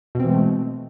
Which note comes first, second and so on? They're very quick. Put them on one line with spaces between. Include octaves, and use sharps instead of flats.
B2 C4 E3 G#3 A3